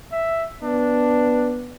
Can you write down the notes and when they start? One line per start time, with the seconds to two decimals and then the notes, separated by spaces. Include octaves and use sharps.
0.12 E5
0.63 B3 D4